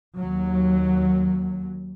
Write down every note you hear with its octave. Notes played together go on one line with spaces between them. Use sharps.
D#2 F#3